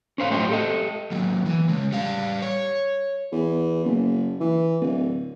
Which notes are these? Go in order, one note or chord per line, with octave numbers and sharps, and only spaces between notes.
C#4 C5 F5
A2 F#3 A3 C5 D#5 G5
G4 A4 D#5
D#2 F#3
E3
C#3 G#3
G3 F5
C#5
E2
F#1
E3
D1